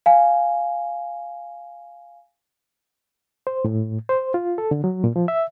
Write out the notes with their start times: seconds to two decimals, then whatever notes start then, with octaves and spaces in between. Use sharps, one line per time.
0.06 F5 G#5
3.47 C5
3.65 A2
4.09 C5
4.34 F4
4.58 A4
4.71 D3
4.84 F#3
5.04 A#2
5.16 F3
5.28 E5